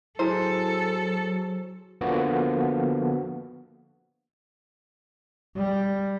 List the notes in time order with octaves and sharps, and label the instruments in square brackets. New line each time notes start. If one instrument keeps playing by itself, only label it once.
[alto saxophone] F#3 [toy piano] E4 A#5 E6 [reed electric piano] G#4 C5 [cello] A4
[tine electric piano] D3 F3 A#3 B3 F#4
[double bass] G3